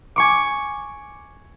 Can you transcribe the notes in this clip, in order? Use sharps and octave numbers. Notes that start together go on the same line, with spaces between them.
G#5 C#6 D6